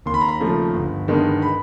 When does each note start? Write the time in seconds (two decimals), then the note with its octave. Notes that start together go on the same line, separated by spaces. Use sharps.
0.06 D#2 C6
0.14 B5
0.21 A#5
0.28 B5
0.40 C#3 F3 A3
0.74 G1
1.08 G2 D#3 G#3 B3
1.42 B5